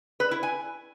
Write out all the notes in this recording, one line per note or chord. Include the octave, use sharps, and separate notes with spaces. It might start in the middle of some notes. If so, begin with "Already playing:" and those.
B4
E4
G#5